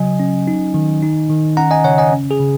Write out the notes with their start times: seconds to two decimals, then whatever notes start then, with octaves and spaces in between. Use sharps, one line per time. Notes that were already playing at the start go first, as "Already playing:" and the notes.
Already playing: C#3 F#3 D#5 G#5
0.20 C#4
0.47 D#4
0.74 D#3
1.02 D#4
1.30 D#3
1.57 C#4 F#5 A#5
1.71 D#5 G#5
1.84 C#3 C#5 F#5
1.98 D#5 G#5
2.12 C#4
2.31 G#4
2.40 C#3